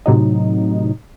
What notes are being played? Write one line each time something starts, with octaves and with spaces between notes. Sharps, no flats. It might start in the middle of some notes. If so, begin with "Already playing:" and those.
A2 C3 F#3 D#4